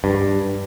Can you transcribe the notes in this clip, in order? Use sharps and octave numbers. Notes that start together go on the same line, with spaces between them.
G2